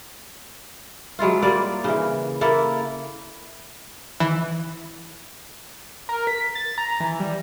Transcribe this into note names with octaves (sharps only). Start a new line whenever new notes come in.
F#3 G#3 E4 F4
G3 A#3 D5
C#3 E3
A#3 E4 A4
E3
A#4
B6
A6
A#5
E3
G3